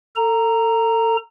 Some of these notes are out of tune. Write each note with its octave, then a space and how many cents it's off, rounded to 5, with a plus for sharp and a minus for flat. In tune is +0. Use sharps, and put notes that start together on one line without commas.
A4 +30 A#5 -5